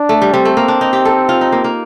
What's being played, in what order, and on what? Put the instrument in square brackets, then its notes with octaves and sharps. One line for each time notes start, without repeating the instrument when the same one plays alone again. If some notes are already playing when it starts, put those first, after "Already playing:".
Already playing: [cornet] D4
[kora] A3
G3
[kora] G3 [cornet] C4
[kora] A3
A#3
D4
D#4
G4
A4
F4
D#4
A#3
A#3